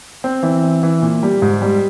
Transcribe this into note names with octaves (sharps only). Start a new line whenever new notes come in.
C4
E3
C4
E3
A#2
G3
G#2
G3